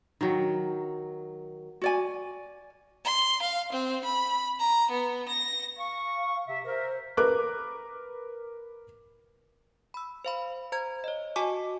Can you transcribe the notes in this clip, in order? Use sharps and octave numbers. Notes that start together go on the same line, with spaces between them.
D#3 F#3
F#4 D5 G#5
C6
F5
C4
B5
A#5
B3
A#6
F5 C#6
C3 E5
A#4 C5 E5
A#4 B4 D6 F#6
B5 E6
C5 F5 B5
C5 A#5 G#6
C#5 D#5
F#4 D#5 G#5 A5 C#6 D6